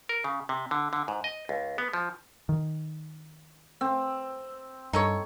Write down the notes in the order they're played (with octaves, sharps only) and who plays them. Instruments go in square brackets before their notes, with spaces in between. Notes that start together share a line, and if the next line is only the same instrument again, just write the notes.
[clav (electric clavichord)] A#4
C#3
C3
D3
D3
G#2
D#5
C#2
B3
F3
[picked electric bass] D#3
[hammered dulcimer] C4
[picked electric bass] G2 [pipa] D#4 A4 C#5